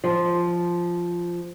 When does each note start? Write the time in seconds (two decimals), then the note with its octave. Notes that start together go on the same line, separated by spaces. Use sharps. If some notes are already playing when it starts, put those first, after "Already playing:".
0.04 F3